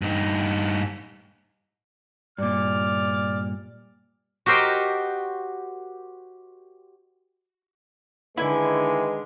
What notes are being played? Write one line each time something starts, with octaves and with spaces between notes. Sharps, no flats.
G2 D#4
G2 A#2 D5 F6
F#4 G4 A#4 C5 D#5 G5
D3 D#3 G#3 E4 B4 G#5